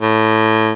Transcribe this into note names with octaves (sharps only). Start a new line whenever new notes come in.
A2